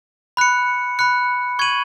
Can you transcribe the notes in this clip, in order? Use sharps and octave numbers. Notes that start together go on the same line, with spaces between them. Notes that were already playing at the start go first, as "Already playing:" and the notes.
B5 F#6 C#7
B5 F#6 C#7
C#6 G#6 D#7 F#7